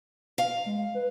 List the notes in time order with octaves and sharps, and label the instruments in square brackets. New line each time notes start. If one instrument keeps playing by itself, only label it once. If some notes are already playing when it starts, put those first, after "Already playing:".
[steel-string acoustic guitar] F5
[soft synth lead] G#3
B4